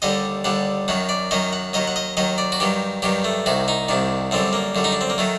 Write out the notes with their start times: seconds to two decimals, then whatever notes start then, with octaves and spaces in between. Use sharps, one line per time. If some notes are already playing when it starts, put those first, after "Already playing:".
0.02 D#2 D3 G3 D#5
0.44 D#2 D3 G3 F#5
0.88 F#2 D#3 F#3 F#5
1.09 D5
1.31 F#2 D#3 F#3 D#5
1.53 F#5
1.73 D#2 D#3 F#3 D#5
1.88 F#5
1.96 D#5
2.17 D#2 D#3 F#3 D#5
2.38 D5
2.52 F#4
2.60 G2 D#3 F#3 G4
3.02 G2 D#3 F#3 G4
3.24 A3
3.46 C2 C3 D#3 F#4
3.68 D#4
3.89 C2 C3 D#3 D4
4.31 F#2 D3 G3 C4
4.53 A#3
4.75 F#2 D3 G3
4.84 D#4
4.92 D4
5.01 C4
5.10 A#3
5.18 D#3 F#3 A3